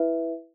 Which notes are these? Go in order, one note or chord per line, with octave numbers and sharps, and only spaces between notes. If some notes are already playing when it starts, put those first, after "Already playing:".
Already playing: E4 B4 E5